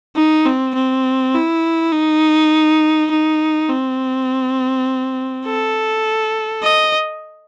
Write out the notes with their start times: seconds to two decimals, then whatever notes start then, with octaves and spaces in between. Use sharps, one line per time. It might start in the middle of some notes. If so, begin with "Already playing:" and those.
0.16 D#4
0.46 C4
0.75 C4
1.34 E4
1.92 D#4
3.11 D#4
3.69 C4
5.46 A4
6.64 D#5